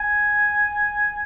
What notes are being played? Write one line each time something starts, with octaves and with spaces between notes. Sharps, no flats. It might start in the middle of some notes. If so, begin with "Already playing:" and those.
Already playing: G#5